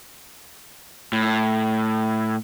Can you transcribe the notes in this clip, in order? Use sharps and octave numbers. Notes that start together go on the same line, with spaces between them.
A2